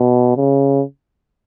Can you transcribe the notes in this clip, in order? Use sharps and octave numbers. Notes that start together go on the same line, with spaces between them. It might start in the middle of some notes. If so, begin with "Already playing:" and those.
Already playing: B2
C#3